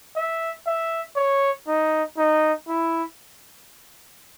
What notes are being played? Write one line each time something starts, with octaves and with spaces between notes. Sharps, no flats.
E5
E5
C#5
D#4
D#4
E4